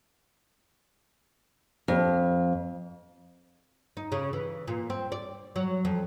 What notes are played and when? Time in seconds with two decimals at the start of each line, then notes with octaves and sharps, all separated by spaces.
1.88 F2
3.97 D#4
4.12 C#3
4.33 E3
4.68 A#2
4.90 C4
5.12 D5
5.56 F#3
5.85 F2